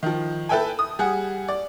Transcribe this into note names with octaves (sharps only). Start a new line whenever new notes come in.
D#3 F3
A4 B4 E5 G5 G#5
D#6
G3 G#4 F#5
D5